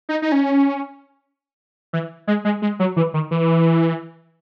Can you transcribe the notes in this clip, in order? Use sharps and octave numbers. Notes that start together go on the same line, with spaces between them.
D#4
D#4
C#4
E3
G#3
G#3
G#3
F#3
E3
D#3
E3